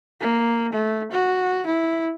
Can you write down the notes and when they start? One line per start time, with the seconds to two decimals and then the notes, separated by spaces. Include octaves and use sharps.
0.20 A#3
0.72 A3
1.11 F#4
1.66 E4